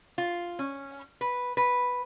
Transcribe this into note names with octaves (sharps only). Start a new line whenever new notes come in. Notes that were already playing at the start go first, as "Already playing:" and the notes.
F4
C#4
B4
B4